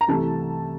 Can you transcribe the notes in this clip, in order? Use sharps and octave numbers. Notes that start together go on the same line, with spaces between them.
A#5
C2 C3 E3 A3 A5